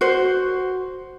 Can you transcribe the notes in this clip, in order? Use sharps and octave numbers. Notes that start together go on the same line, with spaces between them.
F#4 C5